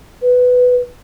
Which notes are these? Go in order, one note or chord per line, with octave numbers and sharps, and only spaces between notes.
B4